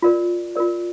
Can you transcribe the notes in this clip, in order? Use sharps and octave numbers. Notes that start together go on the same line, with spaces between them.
F4 A#4 D5
F4 A#4 D5